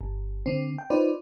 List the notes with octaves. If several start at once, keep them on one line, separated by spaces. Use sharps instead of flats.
G1
D3 C4
G5
D#4 F4 B4 C5 D5